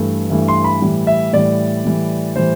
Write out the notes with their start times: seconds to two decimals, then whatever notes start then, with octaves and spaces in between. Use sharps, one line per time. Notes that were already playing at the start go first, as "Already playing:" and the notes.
Already playing: G2 E3 A3
0.30 G2 E3 A3
0.48 C6
0.64 B5
0.82 A2 E3 G3
1.07 E5
1.33 A2 E3 G3 D5
1.85 A2 E3 G3
2.36 A2 E3 G3 C5